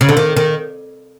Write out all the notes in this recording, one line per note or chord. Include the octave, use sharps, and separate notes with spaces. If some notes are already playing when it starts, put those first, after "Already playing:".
C#3
D3
D#3
D#3